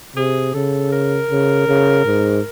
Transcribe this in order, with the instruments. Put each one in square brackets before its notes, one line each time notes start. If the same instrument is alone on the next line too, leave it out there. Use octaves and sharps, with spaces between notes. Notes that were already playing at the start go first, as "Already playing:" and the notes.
[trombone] C3 [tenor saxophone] G#4
[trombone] C#3 [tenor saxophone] A4
[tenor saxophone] A#4
[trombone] C#3
C#3
G#2